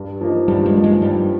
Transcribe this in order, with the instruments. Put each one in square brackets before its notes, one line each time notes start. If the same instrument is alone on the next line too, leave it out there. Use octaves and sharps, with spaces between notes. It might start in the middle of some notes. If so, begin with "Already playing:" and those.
Already playing: [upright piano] G2
F3 A#3 D#4
[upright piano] G2 [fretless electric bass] G3
[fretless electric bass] G#3
[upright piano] F3 A#3 D#4
[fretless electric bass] G#3
[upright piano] G2 [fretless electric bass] G3